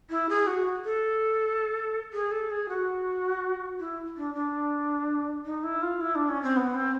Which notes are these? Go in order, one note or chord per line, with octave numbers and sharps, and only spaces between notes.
E4
G#4
F#4
A4
G#4
A4
G#4
F#4
E4
D4
D4
D#4
E4
F4
E4
D4
C#4
C4
B3
C4